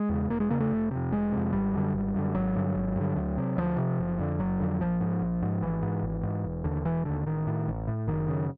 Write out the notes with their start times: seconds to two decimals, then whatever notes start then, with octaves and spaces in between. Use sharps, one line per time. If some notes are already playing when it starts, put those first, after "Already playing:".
Already playing: G#3
0.09 E2 C#3
0.30 E1 A#3
0.40 G#3
0.50 E2 C#3 A#3
0.60 A3
0.71 F1
0.91 F2 C3
1.12 F1 G#3
1.32 F2 C3
1.53 G#1 G3
1.74 F#2 D3
1.94 G#1
2.14 F#2 D3
2.35 G#1 F#3
2.55 G2 D3
2.75 G#1
2.96 G2 D3
3.16 D2
3.37 C3
3.58 D2 F3
3.78 C3
3.99 F#1
4.19 F2 D3
4.39 F#1 F#3
4.59 F2 D3
4.80 A#1 F3
5.01 G#2
5.22 A#1
5.42 G#2
5.62 G#1 E3
5.83 G#2
6.03 G#1
6.23 G#2
6.44 E1
6.64 D#2 D3
6.85 E1 E3
7.05 D#2 D3
7.26 A1 D#3
7.47 A2
7.68 A1
7.88 A2
8.07 F#1 D#3
8.28 F#2 C#3